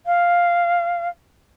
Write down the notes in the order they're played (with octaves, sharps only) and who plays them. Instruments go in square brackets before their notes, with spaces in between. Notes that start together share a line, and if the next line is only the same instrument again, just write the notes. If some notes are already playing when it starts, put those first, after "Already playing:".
[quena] F5